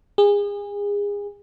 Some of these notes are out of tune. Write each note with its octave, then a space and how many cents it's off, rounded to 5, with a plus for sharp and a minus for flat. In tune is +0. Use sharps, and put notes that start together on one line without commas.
G#4 -30